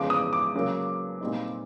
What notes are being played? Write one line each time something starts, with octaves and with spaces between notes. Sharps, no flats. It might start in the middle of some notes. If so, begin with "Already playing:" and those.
Already playing: E2 C#3 F3 G#3 D6
D#6
D6
C#3 F#3 A#3
A#2 G3 C4 D#4